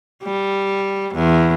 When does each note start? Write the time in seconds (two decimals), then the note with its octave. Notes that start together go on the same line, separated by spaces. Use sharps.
0.24 G3
1.15 E2